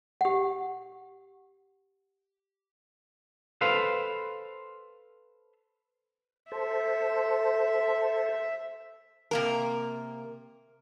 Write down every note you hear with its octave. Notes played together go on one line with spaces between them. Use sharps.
G4 F#5
A4 B4 C5 F5
A4 C5 E5
C3 A#3 A#4